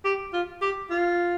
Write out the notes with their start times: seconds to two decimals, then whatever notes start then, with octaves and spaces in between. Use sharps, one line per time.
0.04 G4
0.33 F4
0.61 G4
0.90 F4